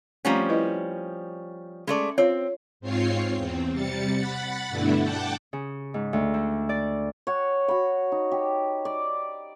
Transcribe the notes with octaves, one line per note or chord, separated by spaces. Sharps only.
F3 G3 A3 C4 C#4 A#5
E4 B4 D#5
G#3 A3 C#4 D5
C4 F4 C#5 F5
G#2 C4 F4 C#5 C7
E2 C4
C3 G3 A6 C#7
F#5 B5 A6
G2 B2 D3 A3 D4 E4
F#5 G5 A5 D6
C#3
G#2
D2
D3
D5
C#5 F#5
F#4 B5
D#4
G4
D5